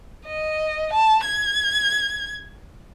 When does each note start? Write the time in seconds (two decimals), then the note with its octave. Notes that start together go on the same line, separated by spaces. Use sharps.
0.26 D#5
0.93 A5
1.25 G#6